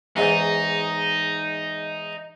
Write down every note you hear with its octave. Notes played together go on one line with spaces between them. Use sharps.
E2 G#2 D#4